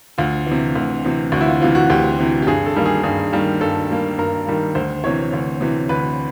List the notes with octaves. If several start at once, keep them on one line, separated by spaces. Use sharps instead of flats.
D2 F4
E3
C3
D2
C3 E3
D2 F#4
E4
F4
C3 E3 F4
F#4
D2 G4
C3 E3
G4
G2 G#4
A4
D#3 G3 A#3
G#4
G2 G#4
D#3 G3 A#3
G2 A4
D#3 G3 A#3
G2 A#4
D#3 G3 A#3
D2 C5
C3 E3 C#5
D2
C3 E3
D2 B4